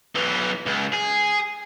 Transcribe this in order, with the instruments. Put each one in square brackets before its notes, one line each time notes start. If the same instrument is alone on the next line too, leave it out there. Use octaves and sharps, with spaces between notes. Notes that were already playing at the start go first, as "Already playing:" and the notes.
[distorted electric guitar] B1 E3
C#2
G#4